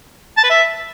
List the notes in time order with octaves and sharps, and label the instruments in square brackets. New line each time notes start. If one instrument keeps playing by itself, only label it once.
[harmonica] A5
B4
E5